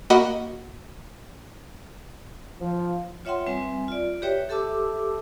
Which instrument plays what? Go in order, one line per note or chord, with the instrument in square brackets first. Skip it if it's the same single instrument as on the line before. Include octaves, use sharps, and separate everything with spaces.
[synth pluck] A#3 F#4 D#5 F#5 B5
[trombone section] F3
[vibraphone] F4 C#5 E5 F#5 G5 C6
G3 C4 B4 E5 G#5
F4 D5
F#4 G4 B4 C#5 E5 G5
G4 A4 E5 A5 D6 E6